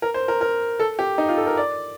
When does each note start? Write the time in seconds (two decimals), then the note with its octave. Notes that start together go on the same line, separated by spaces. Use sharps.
0.02 A#4
0.14 C5
0.28 A#4
0.41 A#4
0.80 A4
0.99 G4
1.18 D#4
1.28 F4
1.37 A4
1.47 A#4
1.57 D5